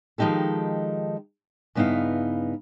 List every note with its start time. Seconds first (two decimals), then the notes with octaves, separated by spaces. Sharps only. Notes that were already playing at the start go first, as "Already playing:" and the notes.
0.18 D#3 F3 G#3 D#4 G4 A4
1.75 G2 C#3 B3 D#4 E4 F5